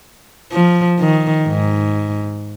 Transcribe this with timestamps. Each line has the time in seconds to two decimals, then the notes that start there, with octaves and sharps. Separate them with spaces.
0.52 F3
1.00 D#3
1.48 G#2